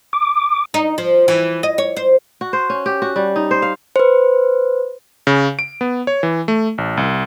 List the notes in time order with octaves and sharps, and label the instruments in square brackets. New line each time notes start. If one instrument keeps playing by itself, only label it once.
[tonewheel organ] D6
[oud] D#4
F3
E3
D#5
C#5
C5
[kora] F#4
C5
C#4
G4
F#4
G3
D#4
C5
F5
[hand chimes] B4 C5
[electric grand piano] C#3
D7
B3
C#5
E3
A3
A1
C2